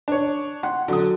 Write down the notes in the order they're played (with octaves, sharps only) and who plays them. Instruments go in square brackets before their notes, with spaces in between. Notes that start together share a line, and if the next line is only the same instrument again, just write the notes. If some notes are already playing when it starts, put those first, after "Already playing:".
[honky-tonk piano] D4 C#5
[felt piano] F#5 C6
[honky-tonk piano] D3 D#6 [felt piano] F#3